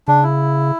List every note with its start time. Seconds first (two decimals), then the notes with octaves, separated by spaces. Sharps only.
0.08 C#3 D4
0.23 E4